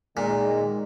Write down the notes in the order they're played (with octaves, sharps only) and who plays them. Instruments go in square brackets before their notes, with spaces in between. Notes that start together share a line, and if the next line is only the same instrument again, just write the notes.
[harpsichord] A#2 [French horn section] D#3 G#3